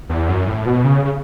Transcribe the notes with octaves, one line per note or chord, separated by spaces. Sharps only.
E2
F#2
A2
B2
C#3
C#3